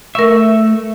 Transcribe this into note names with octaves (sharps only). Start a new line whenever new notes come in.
A3 A#4 E5 C#6